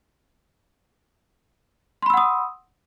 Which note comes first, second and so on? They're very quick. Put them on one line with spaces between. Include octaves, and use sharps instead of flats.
C6 B5 E6 F#5 D#6